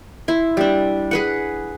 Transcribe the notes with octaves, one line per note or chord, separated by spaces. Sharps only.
E4 C6
G3 D4
G#4 B4 F#5